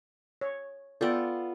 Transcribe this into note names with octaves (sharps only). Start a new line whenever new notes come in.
C#5
B3 F4 A4 D5 G5